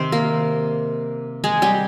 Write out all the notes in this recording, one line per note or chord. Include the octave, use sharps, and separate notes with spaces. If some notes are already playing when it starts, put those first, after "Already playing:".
Already playing: C3 D#3 C4 C5
A#3 A#4
G#3 G#4
G3 G4